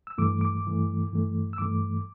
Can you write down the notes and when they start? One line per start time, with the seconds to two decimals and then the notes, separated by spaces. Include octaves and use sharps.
0.07 E6
0.18 G2 E3 A3 D6
0.41 D6
0.65 G2 E3 A3
1.12 G2 E3 A3
1.53 E6
1.58 G2 E3 A3 D6